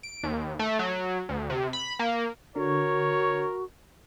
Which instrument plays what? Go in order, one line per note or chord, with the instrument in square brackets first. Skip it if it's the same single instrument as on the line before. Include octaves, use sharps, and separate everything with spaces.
[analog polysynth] D7
D#2
A3
F#3
D2
C3
B5
A#3
[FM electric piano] D3 [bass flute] F#4 [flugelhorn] A#4 [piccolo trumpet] C#5